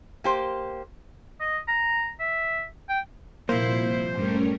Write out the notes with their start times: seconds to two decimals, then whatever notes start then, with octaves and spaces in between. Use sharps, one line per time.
0.24 A#3 G4 C5
1.40 D#5
1.68 A#5
2.20 E5
2.89 G5
3.49 C2 F2 A#2 A#3 E4 C5
4.13 G2 G3 A3 C#4 A#4